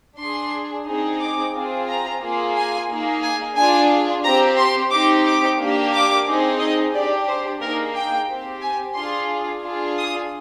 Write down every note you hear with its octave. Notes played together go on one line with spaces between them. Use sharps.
D4 G#4 C6
C4 D#4 G#4
D6
C4 F4 G#4
A#5
A#3 F4 G#4
G#5
A#3 D#4 G#4
G#5
D4 F4 G#4 G#5
C4 G4 A#5
C6
C4 D#4 G4 D6
D6
A#3 D4 G4
D6
C4 D#4 G#4
D#5
D4 G4 D5
C5
A#3 D#4 G#4 A#4
G5
C4 G4
G#5
D4 F4 G#4 C6
D4 F4 G#4
D#6